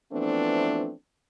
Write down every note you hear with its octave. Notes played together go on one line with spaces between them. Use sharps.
E3 F3 A3 B3 C4 D4